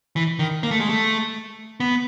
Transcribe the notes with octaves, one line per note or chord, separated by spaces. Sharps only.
E3
D#3
A#3
A3
G#3
A3
B3